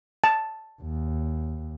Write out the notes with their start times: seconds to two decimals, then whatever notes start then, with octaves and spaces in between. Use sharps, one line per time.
0.24 A5
0.83 D#2